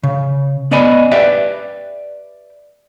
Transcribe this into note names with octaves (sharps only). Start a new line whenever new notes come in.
C#3
B3 C#4 D5 D#5 G#5 B5
G4 B4 D5 E5 G5